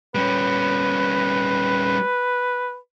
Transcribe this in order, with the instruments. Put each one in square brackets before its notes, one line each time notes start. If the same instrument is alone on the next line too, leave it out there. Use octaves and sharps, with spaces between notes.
[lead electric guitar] G3 C#4 [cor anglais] B4